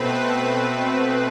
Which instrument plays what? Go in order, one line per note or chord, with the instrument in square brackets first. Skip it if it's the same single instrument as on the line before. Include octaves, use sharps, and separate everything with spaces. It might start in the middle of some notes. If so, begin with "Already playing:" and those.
Already playing: [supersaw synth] B2 A3 C4 B4